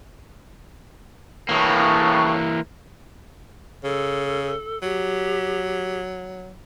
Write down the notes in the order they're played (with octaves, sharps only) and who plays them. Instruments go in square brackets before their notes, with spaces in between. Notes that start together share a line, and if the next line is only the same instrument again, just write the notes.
[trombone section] A2 C#3 [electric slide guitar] E3 A#3
[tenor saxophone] C#3 [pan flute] A4
[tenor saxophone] F#3 [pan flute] G4